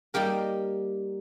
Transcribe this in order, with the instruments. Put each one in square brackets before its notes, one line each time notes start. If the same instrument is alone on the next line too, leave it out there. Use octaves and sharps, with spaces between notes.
[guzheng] G3 A#3 D#4 G4 A#4